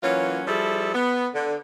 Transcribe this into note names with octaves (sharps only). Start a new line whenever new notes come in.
E3 F#3 A#3 C#4 F4
F3 G3 E4 G#4 A4
B3
D3